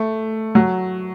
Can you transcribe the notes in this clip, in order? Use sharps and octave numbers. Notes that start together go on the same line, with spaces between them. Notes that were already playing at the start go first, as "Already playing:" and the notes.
Already playing: A3
F#3